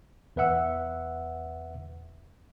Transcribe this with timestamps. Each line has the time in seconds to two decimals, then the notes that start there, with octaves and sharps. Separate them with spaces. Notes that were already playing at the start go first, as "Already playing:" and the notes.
0.36 E2 B4 E5 F#5 E6